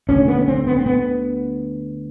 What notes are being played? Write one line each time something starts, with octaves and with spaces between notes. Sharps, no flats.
D2 D3 C#4
B3
C#4
C4
B3
C4
B3